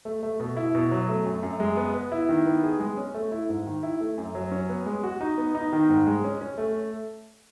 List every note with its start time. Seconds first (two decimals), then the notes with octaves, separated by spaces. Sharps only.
0.05 A3
0.23 A3
0.40 B2
0.57 E4
0.75 B2
0.91 F#3
1.09 A3
1.26 F#2
1.43 F#2
1.60 G#3
1.77 B3
1.94 B3
2.12 E4
2.29 D#3
2.46 B3
2.63 G#4
2.80 G#3
2.97 C#4
3.14 A3
3.32 E4
3.49 G#2
3.66 D#3
3.83 E4
4.01 A3
4.18 F#2
4.35 F#3
4.52 C#4
4.69 B3
4.86 G#3
5.03 F#4
5.21 D#4
5.38 B3
5.55 D#4
5.73 D#3
5.89 G#2
6.07 G#3
6.24 C#4
6.41 C#4
6.58 A3